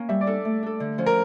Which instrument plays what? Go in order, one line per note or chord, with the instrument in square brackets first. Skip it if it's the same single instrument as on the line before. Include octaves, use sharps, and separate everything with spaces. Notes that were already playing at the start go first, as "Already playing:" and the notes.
Already playing: [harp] A#3 C#4
[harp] G3 [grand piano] E5
[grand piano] D5
[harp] D4 A4
A3
D4 A4
D3
F3 C#4
[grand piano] A#4